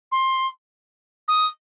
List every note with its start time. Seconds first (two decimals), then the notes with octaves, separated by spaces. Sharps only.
0.12 C6
1.28 D#6